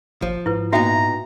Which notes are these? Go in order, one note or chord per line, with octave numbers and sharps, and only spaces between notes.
G#1 F3
G#2 E4 B4
A#2 B3 D#4 F#4 E5 G5 A#5